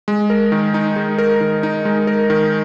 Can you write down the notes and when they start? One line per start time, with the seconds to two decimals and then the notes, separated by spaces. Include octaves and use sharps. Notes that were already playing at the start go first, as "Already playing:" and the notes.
0.08 G#3
0.30 A#4
0.52 D#3
0.74 D#4
0.96 G#3
1.18 A#4
1.41 D#3
1.63 D#4
1.85 G#3
2.07 A#4
2.30 D#3